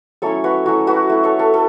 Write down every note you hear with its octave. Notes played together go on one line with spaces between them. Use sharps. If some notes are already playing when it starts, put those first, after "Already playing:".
F#3 A3 C#4 E4 A4 C#5
F#4 B4
F#3 A3 C#4 E4 F#4
F#4 B4
A3 E4
A4 C#5
A4
A4